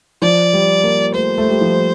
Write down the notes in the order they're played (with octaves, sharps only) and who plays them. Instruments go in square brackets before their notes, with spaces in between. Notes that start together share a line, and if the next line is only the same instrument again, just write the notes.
[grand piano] F3 [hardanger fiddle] D5
[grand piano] G3
A#3
[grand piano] A3 [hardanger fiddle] C5
[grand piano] A3
G3
F3